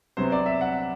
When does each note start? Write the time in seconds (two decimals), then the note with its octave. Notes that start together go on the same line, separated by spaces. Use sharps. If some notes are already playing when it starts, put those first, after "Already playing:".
0.17 C3 F#3 B3 C5
0.32 D5
0.46 E5
0.61 F#5